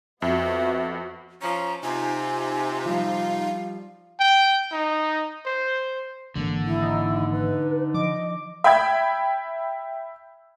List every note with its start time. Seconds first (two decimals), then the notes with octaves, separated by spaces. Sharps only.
0.22 F2 B3 F#4 E5
1.42 F3 C#4 A#5
1.83 C3 D#4 F4 G#5
2.85 F3 G3 F5
4.20 G5
4.72 D#4
5.46 C5
6.35 G#1 D3 E3 A#3
6.65 E4
6.82 D#4
7.32 B4
7.94 F3 D#5 D6
8.64 E5 G5 B5 G#6